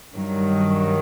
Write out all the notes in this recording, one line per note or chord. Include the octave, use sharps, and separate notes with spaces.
G2 D#3 F#3